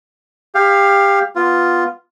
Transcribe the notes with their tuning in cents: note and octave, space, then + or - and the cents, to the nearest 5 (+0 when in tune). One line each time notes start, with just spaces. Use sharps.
G4 +25 F5 +0
B3 +0 F4 +0